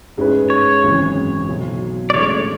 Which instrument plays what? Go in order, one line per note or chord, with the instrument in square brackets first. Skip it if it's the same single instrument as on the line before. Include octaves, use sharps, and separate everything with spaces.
[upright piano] G#2 G#3 C#4 E4 B4
[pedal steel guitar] C#5
[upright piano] G#1 F#2 C#3 E3
B1 B2 F#3
[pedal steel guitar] D5
[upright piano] A1 A2 G#3 D4 A4 [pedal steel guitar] C#5